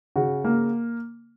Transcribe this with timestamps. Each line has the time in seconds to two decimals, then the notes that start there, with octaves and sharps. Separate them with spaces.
0.16 C#3 F#4
0.44 A#3